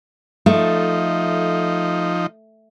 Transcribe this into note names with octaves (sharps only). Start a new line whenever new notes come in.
F3 A3 D#4